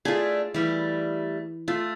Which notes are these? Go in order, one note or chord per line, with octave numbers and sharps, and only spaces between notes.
A3 D4 F4 G#4
E3 G3 A3
A3 F4